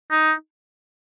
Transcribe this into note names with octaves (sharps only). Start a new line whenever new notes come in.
D#4